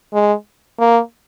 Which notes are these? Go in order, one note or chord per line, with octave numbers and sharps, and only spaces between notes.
G#3
A#3